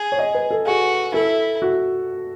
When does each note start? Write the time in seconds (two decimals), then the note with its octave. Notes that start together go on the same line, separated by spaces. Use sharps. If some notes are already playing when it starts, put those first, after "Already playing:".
Already playing: G#4
0.12 C#5
0.19 D#5
0.35 B4
0.51 A4
0.66 F#4 G#4
1.14 E4 A4
1.62 F#4